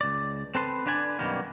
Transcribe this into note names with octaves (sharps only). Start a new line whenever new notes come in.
C#2 D5
C4 A4 B4 C6
D3 D4 B4 D5 G#5
F#2 B2 D#3 G3 A#3